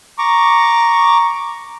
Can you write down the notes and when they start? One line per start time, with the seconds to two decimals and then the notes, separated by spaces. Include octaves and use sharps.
0.18 A#5 C#6 D6